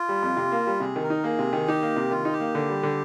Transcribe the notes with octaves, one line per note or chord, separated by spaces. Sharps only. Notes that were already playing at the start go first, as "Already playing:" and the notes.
Already playing: F4
G3
F2
C3
A#3
G3
C3 G#4
D#3
A#4
D#4
A#3 G#4
C3
D#3
D#4 G4
A#3
C3
D#3 F4
D#4
G4
A#3
D3
G3
D3